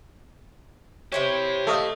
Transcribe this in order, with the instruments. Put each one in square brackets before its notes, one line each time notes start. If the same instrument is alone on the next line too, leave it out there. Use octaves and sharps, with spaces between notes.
[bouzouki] C3 E4 C#5 [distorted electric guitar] G4 C5
[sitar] A3 [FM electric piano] A4 D#5 F5